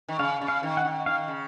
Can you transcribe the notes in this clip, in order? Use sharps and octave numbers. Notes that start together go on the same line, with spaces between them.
D#3
C#3 F5
C#3
F5
D#3
F#5
D#3
D#3 F5
C#3